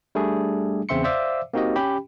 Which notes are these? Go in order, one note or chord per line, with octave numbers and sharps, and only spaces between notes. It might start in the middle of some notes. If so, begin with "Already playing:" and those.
G3 A3 D4 G#4
E2 C#3 C4 E5 C6 C#7
C5 D5 E5 F5 D6 E6
A#3 C4 D#4 F#4 G4 D#5
C#4 G4 G5 B5